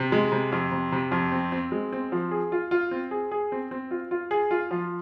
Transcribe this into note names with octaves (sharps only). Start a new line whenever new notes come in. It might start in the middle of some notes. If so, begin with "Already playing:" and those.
Already playing: C3
G#3
C3
F2
C3
C3
F2
C4
C4
G#3
C4
F3
G#4
F4
F4
C4
G#4
G#4
C4
C4
F4
F4
G#4
F4
F3